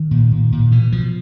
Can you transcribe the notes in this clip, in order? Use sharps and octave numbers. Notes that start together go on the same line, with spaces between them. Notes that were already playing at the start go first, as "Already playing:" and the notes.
Already playing: D#3
A#2
A#2
A#2
B2 E3
B2 F3